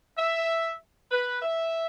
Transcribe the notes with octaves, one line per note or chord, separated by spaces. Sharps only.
E5
B4
E5